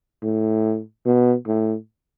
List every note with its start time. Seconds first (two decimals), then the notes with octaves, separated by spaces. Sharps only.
0.22 A2
1.06 B2
1.47 A2